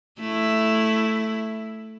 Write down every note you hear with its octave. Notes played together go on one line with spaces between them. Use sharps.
A3 E4